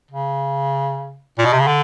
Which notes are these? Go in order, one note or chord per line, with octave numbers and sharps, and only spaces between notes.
C#3
A#2
B2
C3
C#3
D3